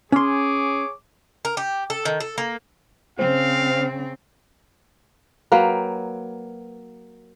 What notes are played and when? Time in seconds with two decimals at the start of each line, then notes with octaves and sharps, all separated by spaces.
0.12 C#4 G#4 C#5 C6 D6
1.45 A#4
1.57 G4
1.90 A4
2.05 D#3
2.20 A4
2.38 A#3
3.19 C#3 C4 C5 F5
5.52 F#3 A#3 B4 G5